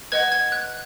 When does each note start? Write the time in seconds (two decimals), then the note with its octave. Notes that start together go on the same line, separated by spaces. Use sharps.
0.12 B4 D#5 F#5 G#6
0.32 G#6
0.52 F#6